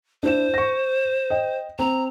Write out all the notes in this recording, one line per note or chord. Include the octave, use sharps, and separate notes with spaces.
D4 E4 C5 E7
C#6 A#6
D#5 G5
C4 A#5